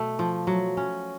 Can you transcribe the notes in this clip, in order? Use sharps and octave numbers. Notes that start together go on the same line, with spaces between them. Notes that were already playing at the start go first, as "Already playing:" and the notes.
Already playing: B2 A3
F3
F#3
C#4